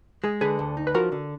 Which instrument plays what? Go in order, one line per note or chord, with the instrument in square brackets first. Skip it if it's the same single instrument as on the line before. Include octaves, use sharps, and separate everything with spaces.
[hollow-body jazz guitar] G#3 [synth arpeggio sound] G#4
[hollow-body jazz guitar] D3 [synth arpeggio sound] G#4 B4
[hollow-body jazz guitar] D2
D#4
[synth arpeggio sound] B4
[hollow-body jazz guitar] F3 [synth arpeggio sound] F#4 A#4
[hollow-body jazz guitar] D3